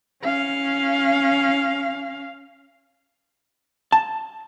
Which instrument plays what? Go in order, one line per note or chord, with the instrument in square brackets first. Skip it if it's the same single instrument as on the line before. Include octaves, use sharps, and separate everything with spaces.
[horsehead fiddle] C#4 F5
[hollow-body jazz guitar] A5